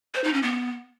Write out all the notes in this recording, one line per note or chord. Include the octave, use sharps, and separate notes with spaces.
C5
D#4
C#4
B3